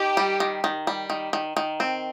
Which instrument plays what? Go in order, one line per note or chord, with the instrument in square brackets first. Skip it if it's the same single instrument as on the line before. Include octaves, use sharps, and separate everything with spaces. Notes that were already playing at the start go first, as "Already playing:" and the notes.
Already playing: [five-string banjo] D#3 [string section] G4
[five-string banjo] G3
D#3
D#3
G3
D#3
D#3
D#3
C4